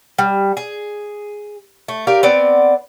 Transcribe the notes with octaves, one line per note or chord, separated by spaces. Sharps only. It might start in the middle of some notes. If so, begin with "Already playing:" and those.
G3
G#4
A3
G4 A#4 D5 F5
B3 C4 D5